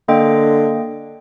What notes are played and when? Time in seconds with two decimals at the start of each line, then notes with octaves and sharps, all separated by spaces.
0.08 D3 A#3 D#5 G5